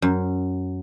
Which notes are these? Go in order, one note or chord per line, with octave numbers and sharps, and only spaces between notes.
F#2